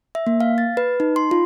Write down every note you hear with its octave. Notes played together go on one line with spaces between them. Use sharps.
E5
A#3
F5
A6
B4
D#4
C6
F4